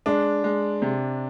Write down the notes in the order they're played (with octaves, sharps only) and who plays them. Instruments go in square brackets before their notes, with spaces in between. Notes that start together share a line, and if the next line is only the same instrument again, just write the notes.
[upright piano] G#3 [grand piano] D4
[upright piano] G#3
C3